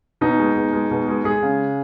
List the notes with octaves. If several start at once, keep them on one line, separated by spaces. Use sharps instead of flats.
B2 D#4
G#3
B2
G#3
B2
G#3
G#3 G#4
C#3